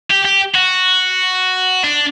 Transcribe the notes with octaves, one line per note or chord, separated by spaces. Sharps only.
G4
G4
F#4
D4